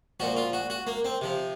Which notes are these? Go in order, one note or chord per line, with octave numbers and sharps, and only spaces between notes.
A#2 F3 F#4
F4
F#4
F#4
A#3
C4
C3 F3